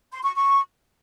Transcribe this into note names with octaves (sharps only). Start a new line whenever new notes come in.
C6
C#6
C#6